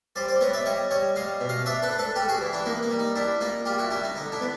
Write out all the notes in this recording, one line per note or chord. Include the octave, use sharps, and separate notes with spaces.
G3 C5 D5
C5 D5
B3 C#5 D#5
D5 E5
G3 C#5 D#5
G3 C#5 D#5
G3 D#5 F5
B2
D#5 F5
D4 D5 E5
A4 B4
D4
A4 B4
G3 G4 A4
F#4 G#4
E3
D4 E4
A#3 D#4
D#4
G3
D#4
G3 D4 E4
A#3 D#4 F4
G3 F4 G4
E4 F#4
G3 D4 E4
D#4
D3 D#4
D4 E4
B3